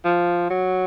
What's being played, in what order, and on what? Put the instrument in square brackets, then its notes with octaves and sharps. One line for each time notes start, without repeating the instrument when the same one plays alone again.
[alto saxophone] F3
F#3